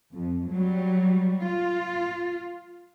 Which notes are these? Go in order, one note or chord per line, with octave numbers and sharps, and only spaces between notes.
F2
F#3 G3
F4